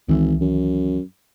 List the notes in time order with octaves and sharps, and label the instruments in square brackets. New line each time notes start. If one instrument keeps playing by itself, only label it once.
[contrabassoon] G#1 [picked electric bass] C#2 D#3 E3
[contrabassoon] F#2